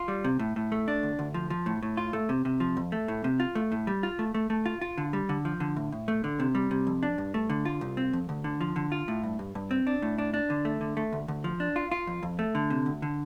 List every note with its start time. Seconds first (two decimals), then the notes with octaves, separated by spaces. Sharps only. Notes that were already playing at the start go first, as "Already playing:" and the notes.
Already playing: F4
0.08 G3
0.24 C3
0.39 A2
0.56 A2
0.72 A3
0.88 D4
1.03 D2
1.19 D2
1.34 F3
1.50 F3
1.66 A2
1.83 A2
1.97 F4
2.13 A3
2.29 C3
2.45 C3
2.60 F3
2.77 F2
2.92 A3
3.08 A2
3.24 C3
3.40 F4
3.55 A3
3.72 A2
3.87 G3
4.03 F4
4.19 A3
4.34 A3
4.50 A3
4.66 F4
4.81 F4
4.98 D3
5.13 G3
5.29 D3
5.45 F3
5.60 D3
5.76 A2
5.92 A2
6.08 A3
6.24 D3
6.40 C3
6.55 G3
6.71 C3
6.87 F2
7.03 D4
7.18 G2
7.34 A3
7.50 D3
7.65 F4
7.81 C2
7.97 C4
8.13 F2
8.29 D2
8.44 D3
8.61 F3
8.76 D3
8.92 F4
9.08 A2
9.23 G2
9.39 G2
9.55 G2
9.71 C4
9.87 D4
10.02 A2
10.18 D4
10.34 D4
10.50 D3
10.65 A3
10.81 D3
10.97 A3
11.13 D2
11.28 D2
11.44 F3
11.60 D4
11.76 F4
11.92 F4
12.07 F2
12.23 F2
12.39 A3
12.55 D3
12.70 C3
12.86 D2
13.02 D3